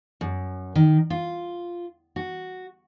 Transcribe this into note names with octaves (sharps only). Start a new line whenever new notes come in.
F#2
D#3
F4
F#4